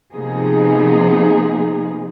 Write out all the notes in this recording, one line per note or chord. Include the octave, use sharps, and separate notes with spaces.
C3 F3 A#3 B3 D#4 G#4